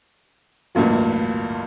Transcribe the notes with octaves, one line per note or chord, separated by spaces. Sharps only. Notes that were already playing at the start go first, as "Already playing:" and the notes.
A1 D2 G2 A#2 F#3